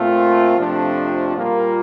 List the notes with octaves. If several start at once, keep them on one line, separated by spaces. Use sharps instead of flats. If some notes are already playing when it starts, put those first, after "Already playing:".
Already playing: A#2 A3 C4 F4
F2 C3 F3 A3 D4
A#2 G3 A#3 F4 A#4